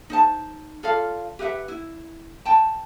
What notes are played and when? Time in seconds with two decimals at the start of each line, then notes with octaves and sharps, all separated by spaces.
0.10 D#4 C5 A5
0.83 F4 A4 D5 F5
1.39 G4 B4 E5 F#5
1.68 E4
2.45 G5 A5